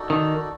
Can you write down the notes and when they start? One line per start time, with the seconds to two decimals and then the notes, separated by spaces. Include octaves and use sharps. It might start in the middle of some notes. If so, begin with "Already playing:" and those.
Already playing: D#4 F#4 A4 D5
0.10 D#3